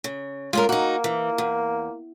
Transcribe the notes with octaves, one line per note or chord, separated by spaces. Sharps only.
C#3
G#3 C#4 F4 A#4
A#3 D#4 F#4
E3
E2